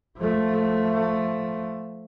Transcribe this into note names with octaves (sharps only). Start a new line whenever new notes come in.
F3 A3